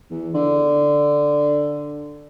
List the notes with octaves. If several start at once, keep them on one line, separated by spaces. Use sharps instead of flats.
E2
D3